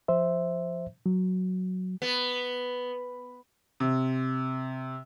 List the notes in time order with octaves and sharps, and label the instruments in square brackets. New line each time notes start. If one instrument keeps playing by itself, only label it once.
[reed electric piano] F3 C5 E5
F#3
[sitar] B3
[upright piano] C3